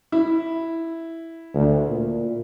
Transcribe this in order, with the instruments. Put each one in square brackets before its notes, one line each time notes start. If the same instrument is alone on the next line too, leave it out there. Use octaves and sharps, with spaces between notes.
[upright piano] E4
[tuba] D2
A#2